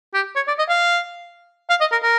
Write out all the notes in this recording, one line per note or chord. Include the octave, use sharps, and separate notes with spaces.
G4
C#5
D5
D#5
F5
F5
D#5
A#4
A#4